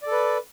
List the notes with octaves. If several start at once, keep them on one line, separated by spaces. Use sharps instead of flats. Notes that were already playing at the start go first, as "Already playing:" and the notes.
A4 B4 D5